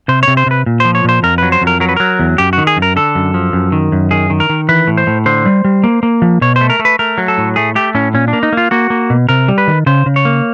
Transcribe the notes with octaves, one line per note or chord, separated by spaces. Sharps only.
C3 C5
C3 C#5
C5
C3 B4
A#2
F3 C5
C#5
A#2 C5
F2 A#4
F#3 B4
C5
F2
A#4
F#3 A#4
B4
F#3 A#4
E2
F#2 G4
D#3 F#4
G#4
F#2
A#4
D3 A4
F#2
F3
F#2
D#3
F#2
D#3 G#4
D#3
A#4
D#3
E3 B4
A2
C5
A2
D3 C5
G3
G3
A#3
A#3
F3
B2 C#5
C5
A3
A#4
A3
B4
A3 A#4
F#3
A4
A2
A3 G#4
A3 G4
A2 C#4
A#2 C#4
D4
A#3
D#4
A#3 F4
A#3 F#4
A#3
B2
C3 A#4
G3
B4
D#3
C#3 C5
C#3
C#5
A#3